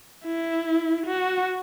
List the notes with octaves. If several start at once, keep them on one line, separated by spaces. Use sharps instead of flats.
E4
F#4